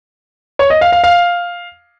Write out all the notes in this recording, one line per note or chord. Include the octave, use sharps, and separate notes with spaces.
C#5
D#5
F5
F5
F5